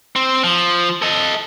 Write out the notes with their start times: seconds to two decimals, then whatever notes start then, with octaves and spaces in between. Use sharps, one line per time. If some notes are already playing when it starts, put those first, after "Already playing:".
0.16 C4
0.44 F3
1.02 A4 D#5